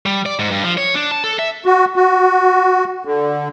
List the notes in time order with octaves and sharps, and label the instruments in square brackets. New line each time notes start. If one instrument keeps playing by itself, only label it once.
[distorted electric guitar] G3
D5
G#2
G2
F3
C#5
D4
A5
A4
E5
[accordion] F#4
F#4
D3